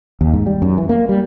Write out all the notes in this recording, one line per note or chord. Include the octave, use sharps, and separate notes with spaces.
D#2
G#2
G3
F#2
E3
A#3
G3